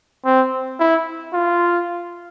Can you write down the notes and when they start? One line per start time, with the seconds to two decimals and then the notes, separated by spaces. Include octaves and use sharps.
0.25 C4
0.79 E4
1.33 F4